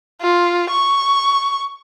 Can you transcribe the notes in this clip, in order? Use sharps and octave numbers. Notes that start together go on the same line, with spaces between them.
F4
C#6